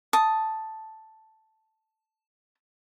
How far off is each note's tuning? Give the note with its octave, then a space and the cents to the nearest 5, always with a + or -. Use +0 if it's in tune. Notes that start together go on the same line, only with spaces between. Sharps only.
A5 +0 D#6 +5